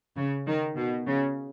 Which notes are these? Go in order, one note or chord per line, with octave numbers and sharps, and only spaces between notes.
C#3
D#3
B2
C#3